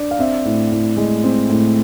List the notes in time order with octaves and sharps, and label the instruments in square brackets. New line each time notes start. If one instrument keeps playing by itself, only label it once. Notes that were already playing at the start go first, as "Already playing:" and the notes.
Already playing: [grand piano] D4
F5
C4 E5
A2
A2
G#3
C4
A2